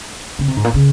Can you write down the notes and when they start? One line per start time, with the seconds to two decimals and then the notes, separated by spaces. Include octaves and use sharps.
0.39 C#3
0.48 C3
0.57 G#2
0.64 A#2
0.74 C#3